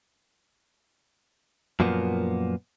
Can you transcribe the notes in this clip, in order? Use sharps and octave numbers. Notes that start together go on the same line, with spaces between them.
F#2 A#2 F3 A#3 B3